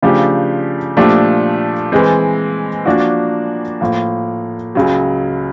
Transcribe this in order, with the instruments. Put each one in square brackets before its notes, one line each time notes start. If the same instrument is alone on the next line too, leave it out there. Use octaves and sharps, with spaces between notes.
[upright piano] C#3 F3 A3 D4 G4
A#2 F3 A3 D4 G4
E3 G#3 C4
F3 A#3 D4 F#4
A2 F3 A#3
C#2 C#3 F#3